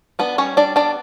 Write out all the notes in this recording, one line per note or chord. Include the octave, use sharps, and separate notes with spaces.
B3 D4 B4
G3 C#4 C#5
G3 D4 D5
B3 D4 D5